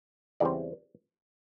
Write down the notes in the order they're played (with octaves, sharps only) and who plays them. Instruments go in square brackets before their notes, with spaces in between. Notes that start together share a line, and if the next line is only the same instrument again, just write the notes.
[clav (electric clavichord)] E2 C#3 E3 G3 C4 D5